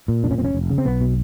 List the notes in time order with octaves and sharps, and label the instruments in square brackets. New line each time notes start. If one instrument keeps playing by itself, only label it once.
[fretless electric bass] A#2
F1 D4
C#4
F1 C4
C#4
F1
C#3
C4
B1 B3
B2